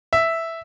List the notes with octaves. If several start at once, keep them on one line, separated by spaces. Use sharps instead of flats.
E5